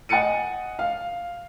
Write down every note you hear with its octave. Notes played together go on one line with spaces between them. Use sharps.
D#5 F#5 G#5 A6 C#7 D#7
F5